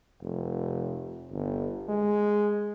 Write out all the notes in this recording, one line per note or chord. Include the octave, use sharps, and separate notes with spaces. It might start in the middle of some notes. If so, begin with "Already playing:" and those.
F1
G1
G#3